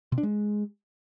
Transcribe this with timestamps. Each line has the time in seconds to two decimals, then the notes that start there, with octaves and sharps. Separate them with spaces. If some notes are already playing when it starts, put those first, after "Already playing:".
0.12 B2
0.18 D4
0.23 G#3